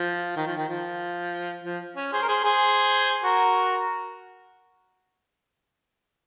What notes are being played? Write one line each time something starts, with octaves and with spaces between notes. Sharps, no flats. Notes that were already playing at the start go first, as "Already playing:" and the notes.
Already playing: F3
D#3
F3
D#3
F3
F3
C#4
G#4 C5
A#4
G#4 C5
G#4 C5
F#4 A#4